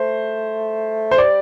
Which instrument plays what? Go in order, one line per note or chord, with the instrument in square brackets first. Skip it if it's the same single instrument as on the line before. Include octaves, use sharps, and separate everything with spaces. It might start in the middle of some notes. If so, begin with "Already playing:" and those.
Already playing: [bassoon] A3 [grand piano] C5
[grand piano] C5
[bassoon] G3 [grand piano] D5